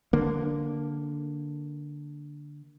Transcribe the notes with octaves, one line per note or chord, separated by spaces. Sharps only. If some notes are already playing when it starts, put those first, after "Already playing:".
D3 A#3